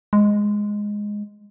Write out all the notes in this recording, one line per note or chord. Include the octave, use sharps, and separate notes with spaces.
G#3